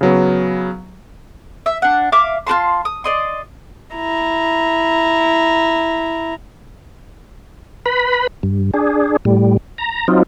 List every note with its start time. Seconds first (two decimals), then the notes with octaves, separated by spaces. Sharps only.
0.01 C#3 F#3 B3
1.66 E5
1.82 D4 F#5
2.12 E5 F5 D6
2.47 F4 F#4 A5 C6
2.85 D#6
3.04 D5 D#5 C6
3.95 E4 A#5
7.86 B4 B5
8.43 G2
8.74 D4 G#4
9.25 A2 G3
9.78 A#5
10.08 F#3 C4 D#4 F4